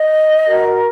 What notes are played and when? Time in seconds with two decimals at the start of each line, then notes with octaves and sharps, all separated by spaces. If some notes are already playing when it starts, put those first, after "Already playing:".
Already playing: D#5
0.46 F#4 A#4